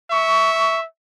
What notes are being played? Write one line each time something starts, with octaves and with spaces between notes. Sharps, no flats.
E5 C#6